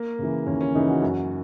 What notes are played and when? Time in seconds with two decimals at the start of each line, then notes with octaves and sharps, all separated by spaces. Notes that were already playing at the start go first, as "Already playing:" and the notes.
Already playing: A#3
0.19 C#3 E3
0.46 D#2 C#4
0.61 C#4
0.74 C#3 E3 D#4
0.88 F#4
1.02 F#2